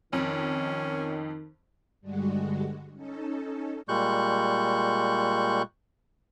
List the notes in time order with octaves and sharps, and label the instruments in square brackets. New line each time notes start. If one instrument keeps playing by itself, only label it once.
[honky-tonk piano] F2 [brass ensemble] D#3 [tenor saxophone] C#4
[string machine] G2 D3 G3 G#3 F#4
C#4 D#4 A4
[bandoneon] A#2 G3 G#3 C#6 F#6 G6